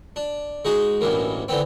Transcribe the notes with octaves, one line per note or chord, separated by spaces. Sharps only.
D4
G#3 D#4 F#4
A1 G2 B2 E3 A#3
D3 E3 B3 C4